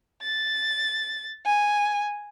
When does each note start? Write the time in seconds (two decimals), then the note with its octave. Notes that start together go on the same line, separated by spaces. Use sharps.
0.23 A6
1.46 G#5